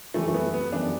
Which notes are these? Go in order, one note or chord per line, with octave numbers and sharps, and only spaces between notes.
F#2 E3 G3 A3
A3
B3
B3
F#2 E3 G3 D4